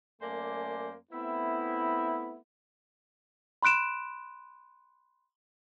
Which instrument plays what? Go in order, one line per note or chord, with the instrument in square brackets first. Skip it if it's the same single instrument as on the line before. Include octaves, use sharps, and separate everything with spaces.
[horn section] F#2 A3 A#3 C5 D5 G#5
A3 B3 C4 E4
[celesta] B5 C6 F#6 D7 E7